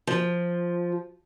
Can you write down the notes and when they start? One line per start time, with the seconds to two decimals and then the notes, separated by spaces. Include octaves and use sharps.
0.07 F3